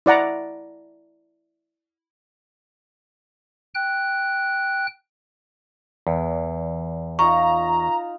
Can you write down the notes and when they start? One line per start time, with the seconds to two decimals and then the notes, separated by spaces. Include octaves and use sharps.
0.06 E4 D5 F#5 A#5
3.75 G5 F#6
6.07 E2
7.19 D#4 F4 F5 A#5 C#6